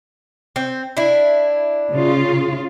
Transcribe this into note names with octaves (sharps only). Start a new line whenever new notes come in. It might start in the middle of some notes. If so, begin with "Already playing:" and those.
C4
D4 E4
C#3 F4